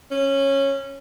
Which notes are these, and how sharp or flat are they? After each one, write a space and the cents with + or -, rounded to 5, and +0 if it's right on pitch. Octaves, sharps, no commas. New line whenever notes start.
C#4 -15